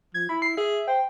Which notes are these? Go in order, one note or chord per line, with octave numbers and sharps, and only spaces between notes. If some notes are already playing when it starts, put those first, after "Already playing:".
F3 G#6
E4 B5
C7
G#4 E5
C5 G5